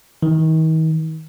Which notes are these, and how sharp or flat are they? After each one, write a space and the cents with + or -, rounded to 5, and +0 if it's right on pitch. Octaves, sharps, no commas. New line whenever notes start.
D#3 +40